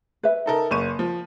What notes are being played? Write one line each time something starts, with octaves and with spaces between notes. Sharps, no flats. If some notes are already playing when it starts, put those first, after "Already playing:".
B4 E5
D#4 A4 A#4
F#1 C#6 D#7
F3